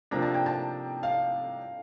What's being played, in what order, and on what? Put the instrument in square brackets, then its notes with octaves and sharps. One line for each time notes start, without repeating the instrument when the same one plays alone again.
[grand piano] C3 F3 A#3 D4 [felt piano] A#5
[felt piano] A5
G5
A5
F5